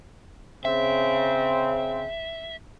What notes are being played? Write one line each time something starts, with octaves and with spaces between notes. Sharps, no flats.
C#3 C4 E5